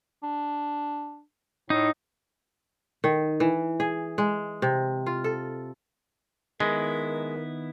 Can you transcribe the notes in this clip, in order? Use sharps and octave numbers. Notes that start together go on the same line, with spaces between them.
D4
A2 D#4
D#3
E3
G#4
G#3
C3
F4
A4
D#3 G#3 B3 E4 A#4